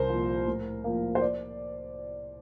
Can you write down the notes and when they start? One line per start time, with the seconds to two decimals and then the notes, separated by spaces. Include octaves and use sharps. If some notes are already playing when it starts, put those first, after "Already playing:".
Already playing: C2 A#4 C5
0.10 A#2 F3
0.47 A2
0.84 F3 A#3
1.15 C5
1.22 D5